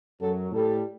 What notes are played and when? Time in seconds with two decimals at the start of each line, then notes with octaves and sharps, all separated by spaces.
0.21 F#2 F#3 A4
0.51 A2 G3 A4